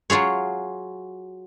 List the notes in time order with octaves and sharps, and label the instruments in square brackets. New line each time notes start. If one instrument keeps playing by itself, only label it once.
[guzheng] F#3 F4 G#4 C#5